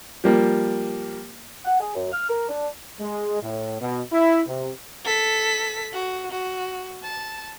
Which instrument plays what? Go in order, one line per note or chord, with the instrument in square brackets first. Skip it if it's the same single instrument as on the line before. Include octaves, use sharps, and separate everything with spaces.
[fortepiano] F3 G3 A#3
[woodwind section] F#5
G#4
F#2
F6
A#4
D4
[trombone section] G#3
A2
B2
E4
C3
[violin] A4 B6
F#4
F#4
A5